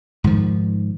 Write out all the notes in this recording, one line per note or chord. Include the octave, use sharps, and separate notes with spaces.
G#2 D#3 F3